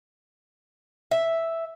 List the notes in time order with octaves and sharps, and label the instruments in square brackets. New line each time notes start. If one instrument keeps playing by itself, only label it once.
[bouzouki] E5